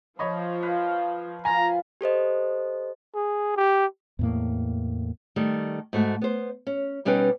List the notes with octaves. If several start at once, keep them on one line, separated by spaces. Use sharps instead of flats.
F3 C#5 D#5 B5
B4 F5
F3 F4 G#5 A#5 B5
G4 A4 C5 D#5
G#4
G4
E2 A2 A#3
D#3 G3 A3
G#2 A3 F#4
B3 C5
C#4
B2 G3 C#4 D#4 B4 G5